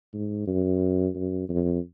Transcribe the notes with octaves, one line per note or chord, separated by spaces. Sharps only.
G#2
F#2
F#2
F2